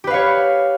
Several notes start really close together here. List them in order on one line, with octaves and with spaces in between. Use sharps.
G4 B4 F5 C#5